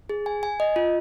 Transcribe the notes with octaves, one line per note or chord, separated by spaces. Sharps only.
G#4
G#5
G#5
D#5
F4